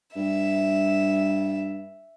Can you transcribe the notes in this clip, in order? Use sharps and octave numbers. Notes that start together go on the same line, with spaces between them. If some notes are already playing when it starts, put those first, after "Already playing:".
G2 E5